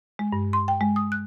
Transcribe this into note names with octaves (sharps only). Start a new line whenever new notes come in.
G#3
G2
C6
G5
G#3
D#6
F#6